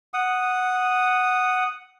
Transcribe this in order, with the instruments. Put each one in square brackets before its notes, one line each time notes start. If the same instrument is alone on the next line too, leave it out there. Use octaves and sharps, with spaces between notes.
[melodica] F#5 D#6